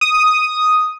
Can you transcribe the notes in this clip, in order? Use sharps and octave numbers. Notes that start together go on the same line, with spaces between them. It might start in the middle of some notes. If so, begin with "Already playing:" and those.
D#6